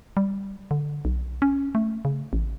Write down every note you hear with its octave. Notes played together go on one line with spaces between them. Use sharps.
G3
D3
B1
C#4
A3
C#3
A1